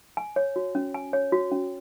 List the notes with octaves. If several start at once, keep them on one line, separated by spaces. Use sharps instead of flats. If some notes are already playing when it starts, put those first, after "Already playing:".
G#5
C#5
F#4
C#4
G#5
C#5
F#4
C#4